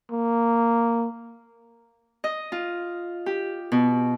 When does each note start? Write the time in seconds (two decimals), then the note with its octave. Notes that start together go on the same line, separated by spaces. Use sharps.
0.11 A#3
2.24 D#5
2.52 F4
3.26 G4
3.72 B2